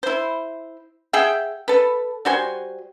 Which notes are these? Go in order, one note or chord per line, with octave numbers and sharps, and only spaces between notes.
E4 C5
G#4 E5 F#5 G5
A4 B4
G3 F#4 C5 G#5